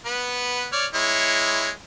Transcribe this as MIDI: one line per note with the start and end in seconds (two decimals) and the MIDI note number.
0.05 0.66 59
0.05 0.66 71
0.72 0.86 73
0.72 0.86 74
0.72 0.86 89
0.94 1.69 56
0.94 1.69 64
0.94 1.69 73